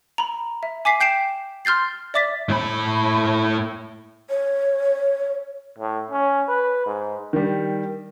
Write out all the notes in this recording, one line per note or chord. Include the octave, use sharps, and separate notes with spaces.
A#5 B5
E5
G#5 D6 B6 C7
G5 G6 C7 D7 E7
C6 F6 G6 A6 C7
D5 E5 D6 A6 B6
A2 B5
C#5
A2
C#4
B4
G#2
D#3 G3